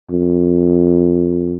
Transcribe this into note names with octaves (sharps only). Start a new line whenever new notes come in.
F2